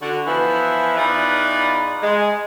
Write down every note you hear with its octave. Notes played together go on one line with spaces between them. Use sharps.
D3 F#4
E3 F3 B3 E4
E2 D#4 F4 B4 D5 E5
G#3